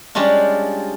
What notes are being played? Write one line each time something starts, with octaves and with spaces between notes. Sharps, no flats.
G3 G#3 C#4 D4 F4